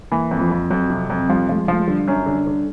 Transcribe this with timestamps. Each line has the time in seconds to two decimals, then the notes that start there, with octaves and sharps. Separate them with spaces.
0.12 E3 A#3
0.31 F2
0.41 F3
0.51 F2
0.70 F2 F#3
0.90 C3
1.10 F2
1.29 F3 G3
1.49 F3 A3
1.58 G#3
1.68 F3 A3
1.80 G#3
1.88 D3 G3
2.08 F#2
2.26 D3
2.47 D3